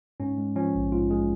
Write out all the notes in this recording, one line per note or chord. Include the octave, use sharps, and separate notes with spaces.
G#2 C#4
G#3
F3 C#4
A#1
G#2 F4
G#3 G#4